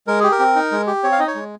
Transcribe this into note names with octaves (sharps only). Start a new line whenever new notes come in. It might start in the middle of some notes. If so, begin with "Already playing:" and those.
G#3 A#4
G4 G#4
A#4
C4
D#4
G#3
G4
C4 C#5
F5
D#4 D#5
C#5
G#3